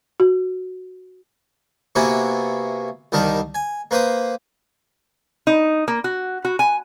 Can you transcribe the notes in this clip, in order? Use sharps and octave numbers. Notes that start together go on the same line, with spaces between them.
F#4
C3 A#3 B3 E4 F#4 G#4
C2 D#3 G3 A#4 A5
G#5
A#3 B4 C5 D#6
D#4
A#3
F#4
F#4
G#5